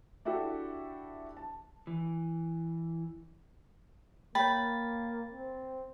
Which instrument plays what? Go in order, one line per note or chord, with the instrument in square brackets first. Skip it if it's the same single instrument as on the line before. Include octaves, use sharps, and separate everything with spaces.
[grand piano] D4 E4 F#4 G4 A4
A5
[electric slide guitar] E3
[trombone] A#3 [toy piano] C#5 G5 [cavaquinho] B5 [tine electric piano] A6
[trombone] C4